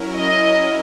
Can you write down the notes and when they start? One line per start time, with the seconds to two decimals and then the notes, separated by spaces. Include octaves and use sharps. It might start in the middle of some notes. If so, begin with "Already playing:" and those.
Already playing: F#3 C#4 E4 A#4
0.16 D#5